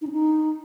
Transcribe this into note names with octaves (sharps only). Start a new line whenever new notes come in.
D#4
C#4
D#4